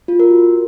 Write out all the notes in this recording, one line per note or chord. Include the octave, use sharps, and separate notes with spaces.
F4
A#4
F#4